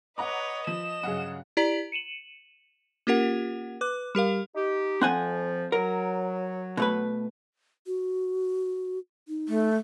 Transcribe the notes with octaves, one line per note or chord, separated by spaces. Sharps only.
B4 C#5 D#5 F#5 A#5 D6
F3 E7
G2 C#3 F#3 G#4 F5 F#5
E4 G4 D5 A#5 B6 F#7
C#7 D#7 E7 F#7
A#3 C#4 F4 G4 A#4 F#5
B4 D6 F#6
G3 G4 A#4 F5
D#4 G4
F2 F3 C4 F#5 G#5
F#3 A#4
B2 A3 B4
F#4
D#4
A3